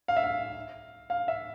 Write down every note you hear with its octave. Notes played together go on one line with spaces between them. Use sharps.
F5
E5
F5
F5
E5